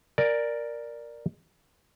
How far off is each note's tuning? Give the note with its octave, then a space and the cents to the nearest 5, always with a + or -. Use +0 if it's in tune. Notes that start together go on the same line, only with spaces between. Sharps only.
A#4 +0 D5 +5 G#5 +0